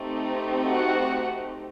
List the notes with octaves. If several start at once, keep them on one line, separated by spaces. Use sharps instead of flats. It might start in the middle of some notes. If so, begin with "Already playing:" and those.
Already playing: A3 C4 D#4 G4
F#4 F#5